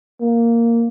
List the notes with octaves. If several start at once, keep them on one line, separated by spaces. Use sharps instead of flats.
A#3